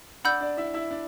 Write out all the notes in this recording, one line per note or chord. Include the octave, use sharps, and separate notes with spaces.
D4 D5 F#5 B5 E6 G6
D4 D5
E4 E5
E4 E5
D4 D5